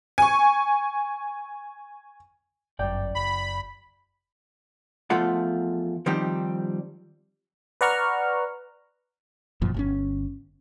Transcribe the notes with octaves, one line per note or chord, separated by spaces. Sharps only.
G#5 C#6
G1 F#2 D5 G5
F#1 B5
E2 F3 A3 F4 F#5
D#3 F3 G3 C4 D#4 G4
B4 D5 F#5 A#5 C#6 F6
G1 F#2 A#2 F3
G1 A#2 C#4